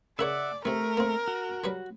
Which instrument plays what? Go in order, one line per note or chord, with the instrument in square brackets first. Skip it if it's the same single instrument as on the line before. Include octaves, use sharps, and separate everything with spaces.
[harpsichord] C#3 A#4 C#5 [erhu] D5 [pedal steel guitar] E5 F#5
[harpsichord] C3 D#3 [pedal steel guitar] A3 [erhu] A#4
[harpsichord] A#3 C4
[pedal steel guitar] F#4
[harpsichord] F#3 G3 B4